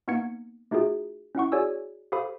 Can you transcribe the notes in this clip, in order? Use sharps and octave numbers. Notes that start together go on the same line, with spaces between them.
A#3 B3 D#4 G#6 C#7
A3 D#4 F4 F#4 G#4
C#4 E4 F#5 C#6
F#4 G#4 C#5 D5 G#5 E6
G4 A4 C5 F5 B5 D#6